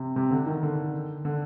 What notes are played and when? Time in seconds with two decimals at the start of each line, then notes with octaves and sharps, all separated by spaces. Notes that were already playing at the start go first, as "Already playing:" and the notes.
Already playing: C3
0.16 C3
0.31 D3
0.46 D#3
0.63 D3
1.25 D3